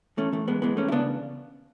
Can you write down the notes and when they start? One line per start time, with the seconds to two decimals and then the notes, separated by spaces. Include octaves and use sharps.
0.17 E3 A3 C#4
0.32 E3 A3
0.47 E2 G#3 B3
0.62 E3 G#3 B3
0.76 E2 A3 C#4
0.88 E4
0.92 C#3 B3 D4